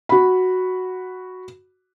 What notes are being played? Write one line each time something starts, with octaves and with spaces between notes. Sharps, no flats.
F#4 B5